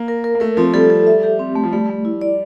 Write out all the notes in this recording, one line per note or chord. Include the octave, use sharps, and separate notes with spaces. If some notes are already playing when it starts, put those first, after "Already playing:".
Already playing: A#3
A#4
A#4
A#3
A3 A#4
F3 C4
G3 A4
A4
E5
G4
C4
A3
F3
G3 A3
A3
E4
D5